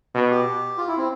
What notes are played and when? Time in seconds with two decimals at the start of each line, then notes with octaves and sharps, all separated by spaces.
0.15 B2
0.31 G4
0.78 F4
0.88 E4
0.98 C4